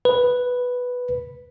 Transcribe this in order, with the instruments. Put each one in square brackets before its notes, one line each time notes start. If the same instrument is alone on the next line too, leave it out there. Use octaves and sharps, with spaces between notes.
[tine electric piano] B4